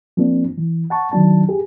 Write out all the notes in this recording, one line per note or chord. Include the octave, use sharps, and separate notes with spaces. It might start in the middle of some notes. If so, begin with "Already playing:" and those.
F3 A#3 C4 D4
E3
F#5 A5 C#6
D#3 F#3 D4 A5
G4 G#4